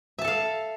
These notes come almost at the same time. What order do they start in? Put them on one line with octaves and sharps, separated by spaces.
E5 A5 A4 F5